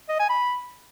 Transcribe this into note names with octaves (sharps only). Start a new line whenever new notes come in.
D#5
G#5
B5